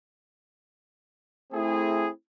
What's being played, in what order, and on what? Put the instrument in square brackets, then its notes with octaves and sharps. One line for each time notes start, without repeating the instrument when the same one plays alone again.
[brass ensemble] A3 C4 E4 G#4